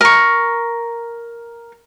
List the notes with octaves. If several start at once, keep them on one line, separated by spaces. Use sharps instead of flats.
A#4 C#6